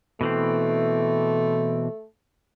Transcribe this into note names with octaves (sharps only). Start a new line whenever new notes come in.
B2 E3 A3 C4